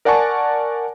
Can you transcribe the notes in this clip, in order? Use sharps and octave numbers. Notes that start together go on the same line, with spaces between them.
A#4 D5 F#5 G#5 A5 C#6